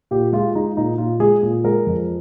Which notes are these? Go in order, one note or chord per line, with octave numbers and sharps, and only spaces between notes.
A#2 G4
G#3 F4
G#3 D#4
A#2 D#4
A#2 F4
G#3 G#4
A#2
G#3 A#4
F2